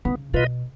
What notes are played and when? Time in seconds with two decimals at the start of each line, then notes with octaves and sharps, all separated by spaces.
0.05 C#3 B3
0.33 B2 F4 B4 D#5